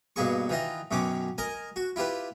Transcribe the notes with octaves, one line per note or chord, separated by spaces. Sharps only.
G2 B2 A#3 G#4 C#6
D#3 E3 F4 D#5
F#2 B2 D#3 C#4 D6
A#4 D#5 G#5
F#4
E4 F4 G4 B4